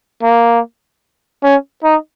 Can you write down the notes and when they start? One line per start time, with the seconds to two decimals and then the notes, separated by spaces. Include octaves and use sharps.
0.23 A#3
1.43 C#4
1.84 D#4